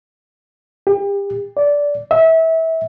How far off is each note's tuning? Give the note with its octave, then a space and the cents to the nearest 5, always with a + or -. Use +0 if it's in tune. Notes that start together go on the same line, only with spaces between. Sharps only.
G4 +35
D5 -15
E5 -25